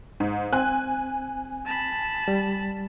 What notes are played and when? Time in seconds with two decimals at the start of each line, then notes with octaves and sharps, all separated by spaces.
0.20 G#2
0.53 C4 G#5 F#6
1.65 A5 B5
2.28 G3